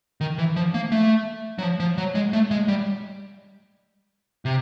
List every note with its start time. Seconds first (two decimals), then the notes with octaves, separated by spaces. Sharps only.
0.21 D#3
0.38 E3
0.56 F3
0.74 A#3
0.92 A3
1.58 F#3
1.63 F3
1.80 F3
1.98 F#3
2.15 G#3
2.33 A3
2.51 G#3
2.68 G3
4.45 C3